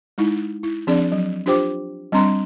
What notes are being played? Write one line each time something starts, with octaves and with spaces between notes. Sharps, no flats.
G#3 D#4 E4
E4
F3 C4 D4 G#4 D5
F#3
D4 F4 G4 C5 G5 D6
G3 C4 D4 A#5 C6